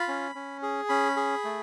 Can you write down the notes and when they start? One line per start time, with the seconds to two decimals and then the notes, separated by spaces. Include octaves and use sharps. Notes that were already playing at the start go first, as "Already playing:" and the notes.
Already playing: F4 B5
0.08 C#4
0.35 C#4
0.62 G#4
0.89 C#4 B5
1.17 G#4
1.44 A3